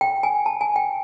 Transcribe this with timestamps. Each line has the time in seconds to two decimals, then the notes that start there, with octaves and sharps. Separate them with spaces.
0.01 G5
0.23 G#5
0.46 A5
0.61 G#5
0.76 G5